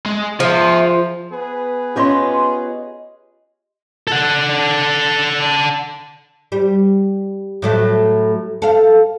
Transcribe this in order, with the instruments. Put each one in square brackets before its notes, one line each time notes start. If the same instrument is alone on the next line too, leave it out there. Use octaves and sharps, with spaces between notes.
[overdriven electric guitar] G#3
[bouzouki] F3 [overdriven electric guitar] G#4 E5
[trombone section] B3 G#4 B4
[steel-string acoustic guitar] C#4 F4 C#5 [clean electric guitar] G4 D#5 C6
[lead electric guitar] A4 F#5
[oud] G3
A2 F#3 A3
A4 F5